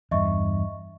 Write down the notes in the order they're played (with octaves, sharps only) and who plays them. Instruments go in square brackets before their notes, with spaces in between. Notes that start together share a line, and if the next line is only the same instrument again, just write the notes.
[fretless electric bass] E2 G2 [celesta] D#5 E5 C#6